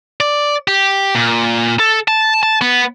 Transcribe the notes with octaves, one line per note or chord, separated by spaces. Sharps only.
D5
G4
A#2
A4
A5
A5
B3